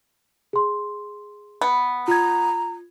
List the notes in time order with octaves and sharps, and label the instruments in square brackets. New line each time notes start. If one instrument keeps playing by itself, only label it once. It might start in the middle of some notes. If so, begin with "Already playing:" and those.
[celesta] G#4 C6
[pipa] B3
[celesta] F4 G#6 [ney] A#5